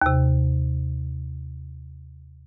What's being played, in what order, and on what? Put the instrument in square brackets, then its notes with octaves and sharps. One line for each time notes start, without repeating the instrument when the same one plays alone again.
[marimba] D#2 C3